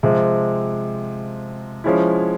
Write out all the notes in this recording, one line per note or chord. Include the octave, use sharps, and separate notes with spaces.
C3 F3 G#3 C4
F3 G#3 C#4 E4